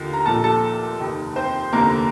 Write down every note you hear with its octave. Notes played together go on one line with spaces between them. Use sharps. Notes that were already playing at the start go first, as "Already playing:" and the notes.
Already playing: D#2 D3 F4
A#5
A#1 A#2 F3 A4 A5
A4 A5
F1 D#2 D#3
C4 C5
F1 D#2 D3 A#3 A#4